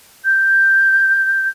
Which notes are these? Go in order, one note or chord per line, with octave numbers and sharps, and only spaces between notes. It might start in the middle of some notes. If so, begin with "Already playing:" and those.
G6